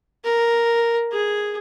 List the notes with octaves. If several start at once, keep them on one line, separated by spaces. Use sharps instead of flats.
A#4
G#4